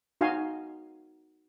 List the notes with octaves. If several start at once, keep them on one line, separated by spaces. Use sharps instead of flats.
D#4 F#4 F5 G#5 C6